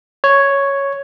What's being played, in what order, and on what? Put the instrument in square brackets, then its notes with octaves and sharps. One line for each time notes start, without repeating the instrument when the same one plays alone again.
[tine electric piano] C#5